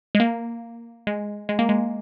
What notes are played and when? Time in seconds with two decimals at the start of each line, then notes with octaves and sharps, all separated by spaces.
0.15 G#3
0.20 A#3
1.07 G#3
1.49 G#3
1.59 A#3
1.69 G#3